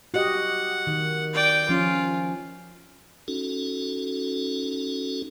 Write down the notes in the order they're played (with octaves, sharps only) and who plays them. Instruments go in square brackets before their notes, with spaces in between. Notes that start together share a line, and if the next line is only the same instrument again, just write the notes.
[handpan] F#4 G4 D#5 [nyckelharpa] F#5
[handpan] D#3
[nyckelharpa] D5 G5
[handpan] F3 C#4 [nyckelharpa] F4
[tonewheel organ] C#4 D#4 F#4 A4